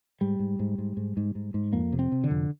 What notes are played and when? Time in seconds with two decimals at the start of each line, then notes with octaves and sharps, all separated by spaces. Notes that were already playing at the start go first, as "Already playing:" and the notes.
0.21 G#2 G3
0.39 G#2
0.59 G#2
0.78 G#2
0.97 G#2
1.17 G#2
1.35 G#2
1.54 G#2
1.73 F2 A#3
1.92 C3
1.99 C4
2.12 C3
2.24 D3
2.31 F2